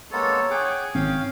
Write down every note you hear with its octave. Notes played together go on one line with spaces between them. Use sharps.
G#3 A#3 B3 A4 C#5
G#4 F#5 G5 D6
G#1 D#3 C4 C#4 F5 G5